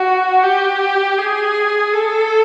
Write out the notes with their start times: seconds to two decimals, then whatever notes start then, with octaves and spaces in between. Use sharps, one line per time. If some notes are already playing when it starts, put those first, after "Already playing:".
Already playing: F#4
0.43 G4
1.19 G#4
1.93 A4